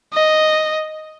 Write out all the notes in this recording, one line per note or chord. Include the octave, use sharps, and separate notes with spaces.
D#5